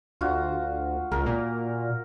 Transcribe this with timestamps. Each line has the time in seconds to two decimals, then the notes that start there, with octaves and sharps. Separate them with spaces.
0.21 D2 F4 F#4
1.12 C#2 A#4
1.26 A#2